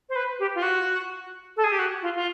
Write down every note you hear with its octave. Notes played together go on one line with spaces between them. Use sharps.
C5
B4
G4
F4
F#4
A4
G#4
G4
F#4
F4
F4